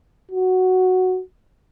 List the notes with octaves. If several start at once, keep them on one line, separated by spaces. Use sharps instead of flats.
F#4